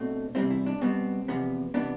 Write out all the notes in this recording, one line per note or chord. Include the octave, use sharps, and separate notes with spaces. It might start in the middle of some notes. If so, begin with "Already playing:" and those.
Already playing: B2 A3 C4 D4
E2 C3 G3 C4 E4
E4
D4
B2 G3 B3 C4
E2 C3 F3 B3
C3 E3 B3 D4